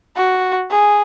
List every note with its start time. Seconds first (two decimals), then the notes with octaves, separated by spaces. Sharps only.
0.16 F#4
0.71 G#4